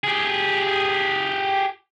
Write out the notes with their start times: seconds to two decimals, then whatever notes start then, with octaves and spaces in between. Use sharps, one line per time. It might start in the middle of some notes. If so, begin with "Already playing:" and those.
0.04 G4 G#4